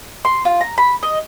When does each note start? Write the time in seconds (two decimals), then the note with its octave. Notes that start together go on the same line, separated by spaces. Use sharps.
0.25 C6
0.45 F4
0.61 A#5
0.78 B5
1.03 D#5